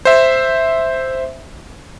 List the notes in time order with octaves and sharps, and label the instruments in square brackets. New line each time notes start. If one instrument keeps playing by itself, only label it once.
[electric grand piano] C5 E5